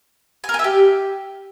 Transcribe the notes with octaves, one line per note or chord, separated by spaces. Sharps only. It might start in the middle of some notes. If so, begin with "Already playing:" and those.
G#5
A#4
G#5
E5
G4